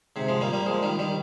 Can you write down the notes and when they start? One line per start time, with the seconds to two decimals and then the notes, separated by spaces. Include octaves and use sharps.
0.16 G#2 C3
0.29 F3 G#3
0.41 G3 A#3
0.53 G3 A#3
0.66 F3 G#3
0.83 D#3 G3
0.99 D#3 G3